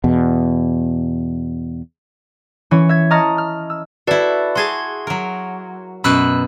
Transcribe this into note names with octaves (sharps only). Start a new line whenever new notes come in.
E2 B2
E3 C#4 C#5
E5 G#6
D#5 A5 A#5 C#6 D#6 F6
F6
E6
E4 F#4 A4 B4 D5
F#4 G#4 A5 C6 G#6
F#3 A#4
F#2 B2 B5 E6 F#6